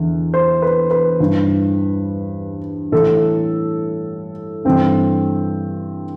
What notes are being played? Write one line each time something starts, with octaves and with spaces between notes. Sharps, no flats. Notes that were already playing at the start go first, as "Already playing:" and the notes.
Already playing: E2 D3
C5
B4
B4
G2 E3
A2 E3 A4
G2 E3 C4